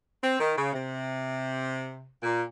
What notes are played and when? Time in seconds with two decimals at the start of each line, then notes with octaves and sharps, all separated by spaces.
0.22 C4
0.39 D#3
0.56 C#3
0.73 C3
2.22 A#2